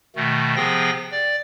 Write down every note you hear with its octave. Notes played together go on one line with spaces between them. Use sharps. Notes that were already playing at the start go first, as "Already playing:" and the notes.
B2 D#3 A3
C3 F3 B3 G#4 G5 A#6
D5